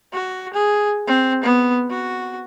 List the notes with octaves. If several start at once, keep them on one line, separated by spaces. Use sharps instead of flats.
F#4
G#4
C4
B3
F#4